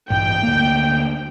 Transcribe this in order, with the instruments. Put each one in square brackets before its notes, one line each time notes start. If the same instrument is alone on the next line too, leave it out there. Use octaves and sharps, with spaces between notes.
[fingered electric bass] A1 G2 [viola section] G5
[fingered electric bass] D2 A#3